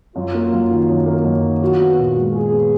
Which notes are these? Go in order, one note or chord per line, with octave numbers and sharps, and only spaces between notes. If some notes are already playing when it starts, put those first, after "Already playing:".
F#2 F4
A#3
F#2
D#3
F#2
A#3
F#2
D#3
F4 F#4
B3
A#2
G#3
F4 G#4
B3